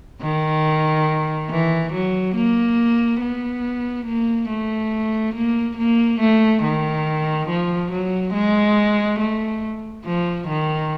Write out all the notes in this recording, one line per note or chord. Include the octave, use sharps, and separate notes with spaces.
D#3
E3
F#3
A#3
B3
A#3
A3
A#3
A#3
A3
D#3
F3
F#3
G#3
A3
F3
D#3